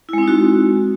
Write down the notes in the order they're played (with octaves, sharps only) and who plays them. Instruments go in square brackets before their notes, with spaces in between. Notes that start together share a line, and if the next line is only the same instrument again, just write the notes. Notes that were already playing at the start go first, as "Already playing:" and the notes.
[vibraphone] E4
G#3
C4
D#4
F#4